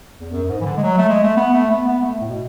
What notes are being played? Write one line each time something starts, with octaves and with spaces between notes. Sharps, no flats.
E2
F#2
F#2
G#2
E3
D3
G#3
F#3
A3
G#3
A3
B3
A3
B3
B3
A3
A2
B2